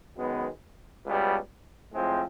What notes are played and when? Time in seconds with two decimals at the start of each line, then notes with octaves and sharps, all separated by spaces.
0.16 F#2 D#3 G#3 B3
1.05 C#2 B2 G3
1.93 A2 F3 G#3 C4